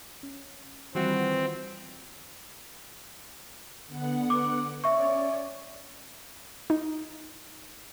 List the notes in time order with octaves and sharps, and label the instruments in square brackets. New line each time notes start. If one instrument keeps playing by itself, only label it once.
[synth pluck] C#4
[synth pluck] D#3 G3 F4 [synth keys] E3 F#4 [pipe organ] C4
[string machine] D3 B3 F#5
[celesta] D6
[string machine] C#4 C#5 D5 [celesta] E5 C#6
[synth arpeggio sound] D#4